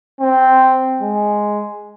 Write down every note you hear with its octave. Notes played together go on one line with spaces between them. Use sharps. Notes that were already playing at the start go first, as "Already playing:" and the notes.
C4
G#3